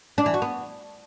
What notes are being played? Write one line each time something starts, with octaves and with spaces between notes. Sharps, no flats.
D4
E3
F#4
B3